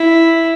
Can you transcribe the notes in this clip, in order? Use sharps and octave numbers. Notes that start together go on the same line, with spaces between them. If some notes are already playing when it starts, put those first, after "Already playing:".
Already playing: E4